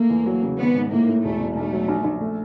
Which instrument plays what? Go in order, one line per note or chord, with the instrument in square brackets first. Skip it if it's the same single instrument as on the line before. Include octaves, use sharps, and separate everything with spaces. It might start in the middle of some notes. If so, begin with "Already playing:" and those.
Already playing: [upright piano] A3 [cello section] A#3
[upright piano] E2
F#3
C#3
[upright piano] G#1 [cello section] B3
[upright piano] G#2
[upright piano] A2 [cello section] A#3
[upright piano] A2
[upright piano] E1 [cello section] A3
[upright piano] E1
[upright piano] B1 [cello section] A3
[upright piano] F#3
A#1
A#1
A3